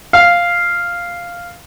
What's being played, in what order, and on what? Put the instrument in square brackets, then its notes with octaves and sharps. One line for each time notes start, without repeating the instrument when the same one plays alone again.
[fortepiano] F5